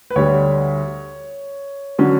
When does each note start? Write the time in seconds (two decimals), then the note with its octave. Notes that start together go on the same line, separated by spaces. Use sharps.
0.10 B4
0.16 D2 D3 G3 C#5
1.99 D3 F#3 C#4